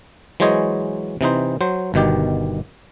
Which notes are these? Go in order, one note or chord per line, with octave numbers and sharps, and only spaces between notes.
E3 F#3 G#3 C5 C#5 D#5
C3 E3 D#4 C5
F#3 C5
G1 B2 D#3 G4